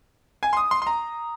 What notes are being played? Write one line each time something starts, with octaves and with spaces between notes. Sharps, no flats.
G#5
C6
D#6
C6
C6
A#5